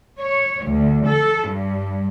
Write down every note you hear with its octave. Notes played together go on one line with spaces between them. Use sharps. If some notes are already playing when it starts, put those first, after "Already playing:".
C#5
D2
A4
G2